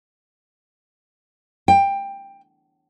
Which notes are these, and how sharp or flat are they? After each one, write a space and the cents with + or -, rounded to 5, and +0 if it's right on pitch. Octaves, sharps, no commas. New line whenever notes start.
G5 +15